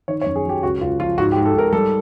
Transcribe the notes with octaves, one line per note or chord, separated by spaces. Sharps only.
D#3 C#5
C#5
F#2
G#4
F#3 G4
C#2 F#4
C#2 F4
F3 F4
G#2 F#4
G4
G#2
A4
G#2 A#4
G3 A4